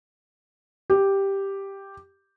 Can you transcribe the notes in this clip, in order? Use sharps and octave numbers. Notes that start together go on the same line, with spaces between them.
G4